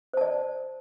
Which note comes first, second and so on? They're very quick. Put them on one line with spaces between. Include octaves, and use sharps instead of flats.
C5 A5 D5